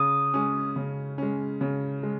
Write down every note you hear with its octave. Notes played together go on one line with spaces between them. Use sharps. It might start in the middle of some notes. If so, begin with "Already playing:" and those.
Already playing: C#3 D#6
G#3 C#4
C#3
G#3 C#4
C#3
G#3